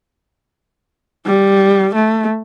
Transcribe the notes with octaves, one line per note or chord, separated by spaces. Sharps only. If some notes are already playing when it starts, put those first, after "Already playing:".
G3
A3